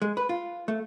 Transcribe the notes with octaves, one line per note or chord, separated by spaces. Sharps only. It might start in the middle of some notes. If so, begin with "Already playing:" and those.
G#3
B4
F4
A3